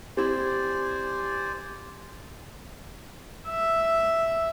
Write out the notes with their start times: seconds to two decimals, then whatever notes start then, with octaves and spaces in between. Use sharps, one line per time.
0.17 C4 E4 G4 C5 D5 G#5
3.49 E5